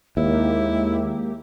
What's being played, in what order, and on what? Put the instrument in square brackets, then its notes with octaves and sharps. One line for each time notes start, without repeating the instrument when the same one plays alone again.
[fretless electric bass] D#2 [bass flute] G#3 [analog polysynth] A#3 G4 [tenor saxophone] E4